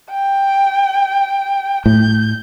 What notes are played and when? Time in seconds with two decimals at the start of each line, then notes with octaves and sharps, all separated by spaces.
0.11 G5
1.86 A2 G6